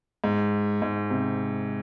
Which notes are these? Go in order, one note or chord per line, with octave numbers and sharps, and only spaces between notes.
G#2
G#2
C3